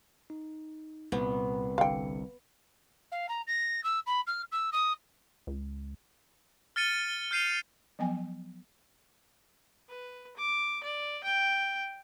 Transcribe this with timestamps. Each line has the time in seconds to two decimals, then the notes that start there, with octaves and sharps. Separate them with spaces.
0.30 D#4
1.12 C2 A#2 B3
1.78 G1 D3 F5 G5 C#7
3.12 F5
3.29 A#5
3.47 A#6
3.84 E6
4.06 B5
4.27 F6
4.52 E6
4.72 D#6
5.47 C#2
6.76 F6 A6 C#7 D#7 G7
7.31 F6 G6 C7 D#7 F7
7.99 F3 F#3 B3 D#5 G5 G#5
9.89 B4
10.37 D6
10.84 D5
11.24 G5